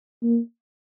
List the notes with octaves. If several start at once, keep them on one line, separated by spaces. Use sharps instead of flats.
A#3